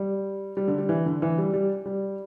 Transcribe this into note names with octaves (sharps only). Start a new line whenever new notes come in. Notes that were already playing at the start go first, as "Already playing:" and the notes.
Already playing: G3
G3
D3
G3
E3
D3
E3
G3
G3
G3